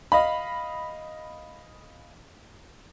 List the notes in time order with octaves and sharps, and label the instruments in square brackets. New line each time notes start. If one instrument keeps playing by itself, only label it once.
[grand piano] D#5 F5 B5